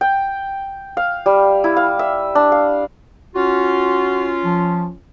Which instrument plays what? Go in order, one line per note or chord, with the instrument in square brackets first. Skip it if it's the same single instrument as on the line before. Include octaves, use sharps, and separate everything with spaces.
[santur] G5
F5
G3
E4
F5
E5
D4
F5
[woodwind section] C#4 F4 [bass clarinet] F#4
[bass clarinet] F3